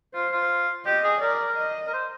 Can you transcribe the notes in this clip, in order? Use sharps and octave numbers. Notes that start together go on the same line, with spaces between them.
F4 C5
F4
G4 D#5
G#4
A#4 D5
D#5
A#4
C5